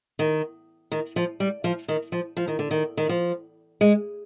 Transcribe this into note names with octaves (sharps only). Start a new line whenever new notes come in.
D#3
D#3
F3
G3
F3
D#3
F3
F3
D#3
D3
D#3
D#3
F3
G#3